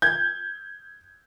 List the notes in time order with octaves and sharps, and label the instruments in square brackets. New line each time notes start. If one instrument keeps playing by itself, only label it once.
[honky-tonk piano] G6 G#6